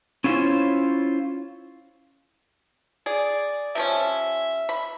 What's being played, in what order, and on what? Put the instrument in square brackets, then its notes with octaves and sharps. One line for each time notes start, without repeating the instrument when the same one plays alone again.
[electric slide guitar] C#4 E4 F4 G4 C5 C#5
[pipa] G#4 [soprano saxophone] D5
[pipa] C3 F3 C#4 [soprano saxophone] E5
[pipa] B5